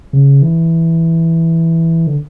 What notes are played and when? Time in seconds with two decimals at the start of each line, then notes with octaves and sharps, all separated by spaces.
0.13 C#3
0.42 E3
2.07 D3